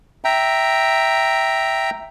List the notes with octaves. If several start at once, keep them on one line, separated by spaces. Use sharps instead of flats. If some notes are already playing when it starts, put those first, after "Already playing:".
E5 G5 A#5